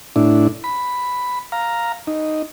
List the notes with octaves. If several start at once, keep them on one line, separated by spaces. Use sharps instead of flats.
A2 D4 E4
B5
F5 A#5
D#4